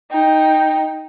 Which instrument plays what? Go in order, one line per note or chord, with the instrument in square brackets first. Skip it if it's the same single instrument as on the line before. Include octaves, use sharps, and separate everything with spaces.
[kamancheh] D#4 G5